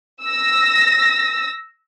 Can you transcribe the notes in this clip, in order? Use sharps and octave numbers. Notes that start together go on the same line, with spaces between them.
E6 A#6